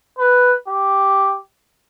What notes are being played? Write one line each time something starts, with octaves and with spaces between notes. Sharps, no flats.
B4
G4